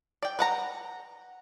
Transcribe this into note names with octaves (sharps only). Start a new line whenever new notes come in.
D5 G5
B4 F#5 A#5